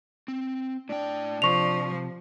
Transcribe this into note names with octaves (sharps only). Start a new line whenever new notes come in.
C4
A2 D4 G5
C3 F3 C#6 F7